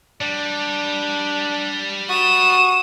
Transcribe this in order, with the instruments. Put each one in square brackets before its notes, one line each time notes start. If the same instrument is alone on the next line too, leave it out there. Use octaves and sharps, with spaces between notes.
[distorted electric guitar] G3 [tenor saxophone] D4
[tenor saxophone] F#4 [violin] D#6 E7